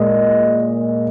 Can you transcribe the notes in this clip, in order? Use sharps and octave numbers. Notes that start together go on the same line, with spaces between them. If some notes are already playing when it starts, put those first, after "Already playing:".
Already playing: A#2 G#3 D#5